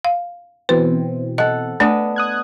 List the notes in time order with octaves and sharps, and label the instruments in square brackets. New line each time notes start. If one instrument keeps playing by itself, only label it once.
[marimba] F5
[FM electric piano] B2 E3 C4 [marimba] B4
[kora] A4 F#5 [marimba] D#5
[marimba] A3 [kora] B3 D4 D#5
[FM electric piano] D#6 F#6 G#6